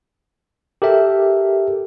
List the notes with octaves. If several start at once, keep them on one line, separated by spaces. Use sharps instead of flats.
G4 A4 A#4 E5